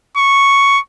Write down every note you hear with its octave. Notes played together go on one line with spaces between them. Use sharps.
C#6